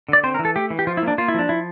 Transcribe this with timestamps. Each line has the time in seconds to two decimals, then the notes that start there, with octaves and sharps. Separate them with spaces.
0.09 D3 D5
0.24 C4 C5
0.35 A#4
0.39 E3
0.45 A4
0.56 A3 G4
0.70 E3
0.79 G4
0.87 F3 F4
0.97 E4
1.02 A#3
1.08 D4
1.18 A#3 F4
1.28 E4
1.34 F3 D4
1.49 F3 E4